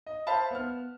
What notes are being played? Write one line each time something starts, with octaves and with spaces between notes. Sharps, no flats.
D#5
C5 E5 F5 A5 B5
B3 F6